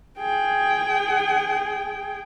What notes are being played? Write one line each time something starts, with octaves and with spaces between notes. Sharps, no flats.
G#4 G5